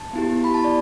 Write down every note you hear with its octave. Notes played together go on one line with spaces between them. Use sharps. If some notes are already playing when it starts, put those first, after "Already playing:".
Already playing: A5
B3 E4 G4
B5
A5
D5